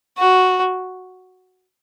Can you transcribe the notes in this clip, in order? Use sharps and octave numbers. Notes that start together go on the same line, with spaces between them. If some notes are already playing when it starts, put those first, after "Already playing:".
F#4